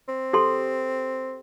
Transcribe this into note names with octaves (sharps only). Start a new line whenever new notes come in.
C4
G4 A4 C6